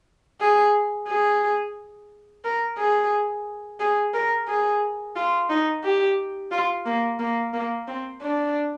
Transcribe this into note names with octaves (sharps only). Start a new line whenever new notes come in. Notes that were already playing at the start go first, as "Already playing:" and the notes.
G#4
G#4
A#4
G#4
G#4
A#4
G#4
F4
D#4
G4
F4
A#3
A#3
A#3
C4
D4